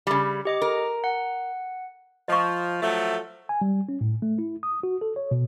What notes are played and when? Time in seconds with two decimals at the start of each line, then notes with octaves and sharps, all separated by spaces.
0.07 C#3 G3
0.45 G4 D#5 D6
0.62 A#4
1.04 F#5
2.28 F3 D#5 C#6
2.82 F3 F#3 A3
3.49 G#5
3.61 G3
3.89 C#4
4.01 A2
4.22 A3
4.38 E4
4.63 D#6
4.83 F#4
5.01 A4
5.16 C#5
5.31 B2